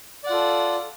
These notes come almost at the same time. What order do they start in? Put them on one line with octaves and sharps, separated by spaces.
D5 F#5 F4 A4